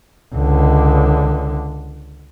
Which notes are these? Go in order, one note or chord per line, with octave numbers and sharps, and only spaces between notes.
C#2 D3